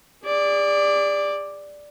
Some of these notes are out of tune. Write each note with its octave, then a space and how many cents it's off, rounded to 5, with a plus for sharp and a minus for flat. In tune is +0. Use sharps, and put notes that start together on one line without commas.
G#4 -40 D5 +0